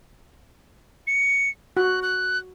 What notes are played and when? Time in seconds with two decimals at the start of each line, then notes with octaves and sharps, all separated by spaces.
1.07 C#7
1.77 F#4 F#6
2.02 F#6